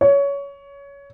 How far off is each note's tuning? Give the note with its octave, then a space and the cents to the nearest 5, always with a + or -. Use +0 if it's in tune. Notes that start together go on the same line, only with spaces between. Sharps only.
C#5 +20